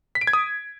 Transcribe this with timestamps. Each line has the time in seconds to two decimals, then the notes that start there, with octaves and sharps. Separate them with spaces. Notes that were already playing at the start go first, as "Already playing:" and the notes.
0.15 B6
0.21 D7
0.27 G#6
0.33 D#6